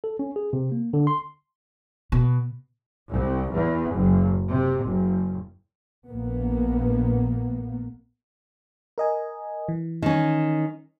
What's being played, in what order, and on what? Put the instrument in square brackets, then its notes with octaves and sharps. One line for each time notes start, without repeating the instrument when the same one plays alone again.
[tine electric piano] A4
C#4
G#4
C3
A#3
D3
C6
[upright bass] B2
[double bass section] C2
E2
F#1
C3
F#1
A#1 A#3 B3
[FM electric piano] A#4 D#5 G#5
E3
[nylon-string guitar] D#3 C#4